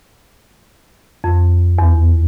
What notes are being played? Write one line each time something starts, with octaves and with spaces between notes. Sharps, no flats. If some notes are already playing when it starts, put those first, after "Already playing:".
F2
E2